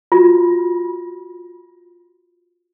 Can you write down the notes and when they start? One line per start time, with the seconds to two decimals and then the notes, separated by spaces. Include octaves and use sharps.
0.12 F4 F#4